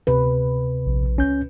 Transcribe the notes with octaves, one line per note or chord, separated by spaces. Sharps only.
D2 C3 B4
A#1
C#2 C#4 G6